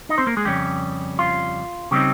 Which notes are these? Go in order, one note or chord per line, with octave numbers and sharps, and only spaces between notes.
D#4 D#5
C4 C5
A#3 A#4
G#3 G#4
F2 C#3 G3 C#4 G4
F4
C#3 G3 C4 D#4 G4